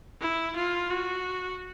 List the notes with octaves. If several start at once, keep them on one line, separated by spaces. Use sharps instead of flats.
E4
F4
F#4